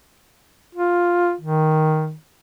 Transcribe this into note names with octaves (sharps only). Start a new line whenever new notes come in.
F4
D#3